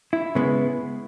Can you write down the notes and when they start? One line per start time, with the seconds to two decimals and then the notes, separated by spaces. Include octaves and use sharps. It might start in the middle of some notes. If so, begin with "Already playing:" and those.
0.13 E4
0.35 C#3 G#3 B3